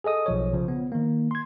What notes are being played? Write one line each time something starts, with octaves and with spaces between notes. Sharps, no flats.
G#4 A4 D#5 D#6
B1 F3 C#5
C#3 F3
B3
D#3 A#3
C6 G#6